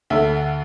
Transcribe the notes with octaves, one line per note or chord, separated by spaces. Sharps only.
D2 D3 A3 E5